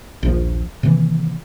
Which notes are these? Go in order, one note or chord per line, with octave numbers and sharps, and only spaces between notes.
A#1 D#2 F3
C3 D#3 E3 A#3